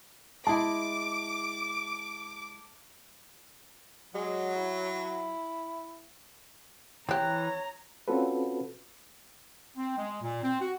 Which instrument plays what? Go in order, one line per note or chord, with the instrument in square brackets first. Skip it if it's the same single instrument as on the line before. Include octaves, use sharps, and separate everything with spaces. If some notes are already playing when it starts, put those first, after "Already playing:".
[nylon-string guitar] G#3 E4 [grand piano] A5 [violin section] D6
[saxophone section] F#3 [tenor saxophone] G#3
[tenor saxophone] E4
[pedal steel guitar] E3 F#6 [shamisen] C4 G4 [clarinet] C#5 [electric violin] A#5
[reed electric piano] C4 C#4 F4 F#4 A4 B4
[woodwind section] C4
G#3
A#2
C4
F#4